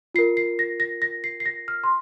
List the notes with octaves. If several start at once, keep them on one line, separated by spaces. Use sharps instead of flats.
F4 A#4 C7
C7
A#6
A#6
A#6
C7
C7
A#6
F6
C6